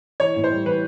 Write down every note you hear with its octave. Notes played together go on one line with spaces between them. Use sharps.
E3 C#5
A2
C5
G3
E3 B4